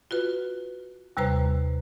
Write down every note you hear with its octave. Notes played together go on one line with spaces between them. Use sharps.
F4 F#4 B4
D#2 C3 G3 B4 C5 A#5